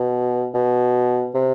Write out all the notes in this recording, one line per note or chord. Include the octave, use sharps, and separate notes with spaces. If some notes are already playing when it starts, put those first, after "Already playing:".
Already playing: B2
B2
C3